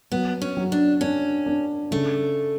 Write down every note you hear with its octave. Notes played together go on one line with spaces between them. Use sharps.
F#3 B3
C#4
F#3
D4
C#4 D4
D4
C#3 A3